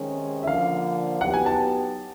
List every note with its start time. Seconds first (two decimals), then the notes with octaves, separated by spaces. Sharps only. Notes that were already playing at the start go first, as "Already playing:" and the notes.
Already playing: C3 D#3 G#3 C#4
0.43 E5
0.47 D3 F3 A#3 F5
1.21 A2 F#3 B3 D#4 G4 F#5
1.34 G#5
1.46 A5